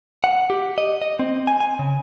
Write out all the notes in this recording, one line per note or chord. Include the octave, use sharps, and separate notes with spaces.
F#5
G4
D#5
D#5
C4
G#5
G#5
C#3